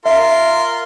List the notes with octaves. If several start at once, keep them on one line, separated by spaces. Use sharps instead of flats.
F4 A#4 E5 C6